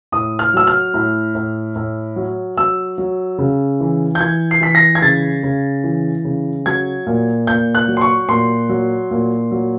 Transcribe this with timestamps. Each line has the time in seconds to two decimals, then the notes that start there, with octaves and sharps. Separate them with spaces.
0.12 A2 D#6
0.39 F6
0.54 F#3 E6
0.67 F6
0.94 A2
1.35 A2
1.76 A2
2.16 F#3
2.57 F#3 E6
2.98 F#3
3.38 C#3
3.80 E3
4.15 G6
4.20 E3 G#6
4.51 C7
4.61 E3 B6
4.75 A#6
4.95 G#6
5.02 C#3 A6
5.43 C#3
5.84 E3
6.24 C#3
6.66 F#3 G#6
7.07 A#2
7.47 A#2 G6
7.75 F#6
7.88 F#3
7.97 C6
8.01 C#6
8.29 A#2 C6
8.69 F#3
9.11 A#2
9.51 F#3